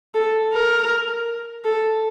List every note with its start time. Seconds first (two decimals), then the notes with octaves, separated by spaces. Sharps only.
0.15 A4
0.53 A#4
1.65 A4